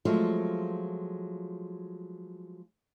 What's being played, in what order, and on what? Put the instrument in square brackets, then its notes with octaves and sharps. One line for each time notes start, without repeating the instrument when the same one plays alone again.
[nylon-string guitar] F3 F#3 G#3 A3 C4 F4